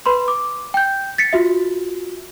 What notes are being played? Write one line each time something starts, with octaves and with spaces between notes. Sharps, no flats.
B4 B5 C6
D6
G5 G6
A6 B6 C#7
F4 F#4 E5